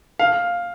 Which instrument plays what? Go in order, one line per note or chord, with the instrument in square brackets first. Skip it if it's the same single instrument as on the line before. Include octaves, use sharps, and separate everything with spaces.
[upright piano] F5